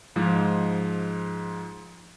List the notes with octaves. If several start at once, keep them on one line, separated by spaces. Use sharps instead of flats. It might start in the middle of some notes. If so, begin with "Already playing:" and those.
G#2 F3 G#3